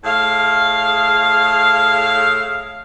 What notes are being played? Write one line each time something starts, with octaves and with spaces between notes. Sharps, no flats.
A2 G#4 F5